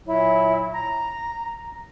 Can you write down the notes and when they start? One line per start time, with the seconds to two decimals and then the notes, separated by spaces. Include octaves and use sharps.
0.07 A#2 F#3 E4
0.73 A#5